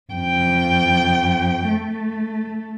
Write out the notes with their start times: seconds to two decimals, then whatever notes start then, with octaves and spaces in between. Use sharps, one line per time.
0.12 F2 G5
1.68 A3